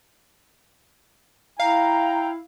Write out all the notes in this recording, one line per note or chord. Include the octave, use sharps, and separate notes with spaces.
E4 F5 G5 A#5